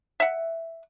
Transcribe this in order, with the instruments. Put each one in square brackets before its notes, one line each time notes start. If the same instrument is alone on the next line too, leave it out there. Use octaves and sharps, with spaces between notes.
[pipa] E5 F#5